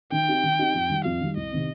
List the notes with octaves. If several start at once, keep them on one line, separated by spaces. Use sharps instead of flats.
D#3 G5
C4 D#4 G4
D#3
C4 D#4 G4
F2
D#3 G3
F2 F5
D#3 G3
C2 D#5
C3 D#3 C4